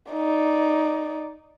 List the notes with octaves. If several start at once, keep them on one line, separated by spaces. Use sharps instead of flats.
D#4 D5